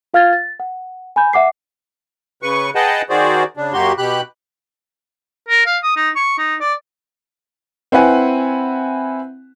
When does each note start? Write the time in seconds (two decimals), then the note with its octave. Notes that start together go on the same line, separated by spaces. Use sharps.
0.14 F4 F5 F6 G#6 A6
0.33 A6
0.60 F#5
1.16 G#5 B5 G6
1.33 E5 F#5 D6 C7
2.43 C#3 B4 C#6
2.75 G#4 B4 D#5 F#5 G5 A5
3.10 D#3 F#4 G#4 C5 D5
3.57 C#3 D4
3.73 F#2 A#3 F#4 G4 C6
3.98 B2 G4 B5 F#6
5.48 A#4
5.66 F5
5.83 D#6
5.96 D#4
6.16 C#6
6.38 D#4
6.60 D5
7.92 C4 E4 B4 F#5 G#5